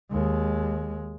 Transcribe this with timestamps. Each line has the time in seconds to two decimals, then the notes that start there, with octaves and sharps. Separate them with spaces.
0.12 D#2 G#3